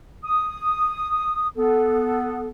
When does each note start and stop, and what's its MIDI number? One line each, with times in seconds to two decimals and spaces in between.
0.24 1.48 87
1.57 2.48 59
1.57 2.48 69